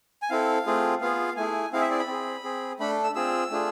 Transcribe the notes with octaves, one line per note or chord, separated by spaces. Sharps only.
G#5
C4 E4 A4 F5
A3 C4 F4 G#4
B3 F4 G#4 F5
A3 E4 G#4 G#5
C4 E4 G#4 F5
E5
D5
B5
C4 G#4
C4 G#4
A3 D4 A4 B5
E6
C4 F4 G#4 E6
A3 D4 F4 G#4